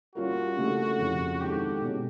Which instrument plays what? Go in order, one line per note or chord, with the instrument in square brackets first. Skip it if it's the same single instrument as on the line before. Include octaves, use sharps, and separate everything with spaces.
[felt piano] G3 A#3 C#4 F4 A#4 [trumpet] F#4
[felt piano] C#3 E3 A3 D4 G4
F2 C#3 F3
[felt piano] D#3 G#3 C4 E4 A4 [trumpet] G4
[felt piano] B2 G#3 C#4